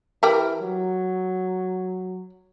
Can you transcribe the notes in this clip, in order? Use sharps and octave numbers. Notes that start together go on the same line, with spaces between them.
E3 G4 A#4 G5
F#3